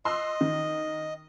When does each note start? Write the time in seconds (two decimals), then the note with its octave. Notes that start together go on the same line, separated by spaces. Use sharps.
0.05 D#5 C6 E6 F#6
0.41 D#3